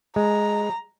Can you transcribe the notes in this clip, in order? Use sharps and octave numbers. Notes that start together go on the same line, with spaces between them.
G#3 A#5